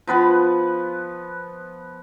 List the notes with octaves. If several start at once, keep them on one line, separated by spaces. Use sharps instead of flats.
F3 B3 B4 B5